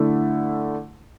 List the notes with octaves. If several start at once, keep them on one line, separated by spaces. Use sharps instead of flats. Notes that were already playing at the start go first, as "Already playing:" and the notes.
Already playing: D3 A3 E4